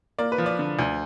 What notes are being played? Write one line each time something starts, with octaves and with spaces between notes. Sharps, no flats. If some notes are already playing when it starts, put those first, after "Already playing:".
A#3 D5
B4
F3
D5
D3
D2